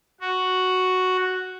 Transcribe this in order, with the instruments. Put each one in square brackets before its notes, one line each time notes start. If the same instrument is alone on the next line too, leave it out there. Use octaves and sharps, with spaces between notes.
[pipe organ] F#4